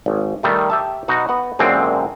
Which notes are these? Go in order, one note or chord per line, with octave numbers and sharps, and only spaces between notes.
G#1
D#3 G3 A3
G4 E5 A5
B2 D#4 F#4
B3 F#5
F#2 A#2 D3 G#3 C4